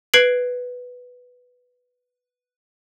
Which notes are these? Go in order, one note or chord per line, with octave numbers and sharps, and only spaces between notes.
B4 G#6 C7 D7 F#7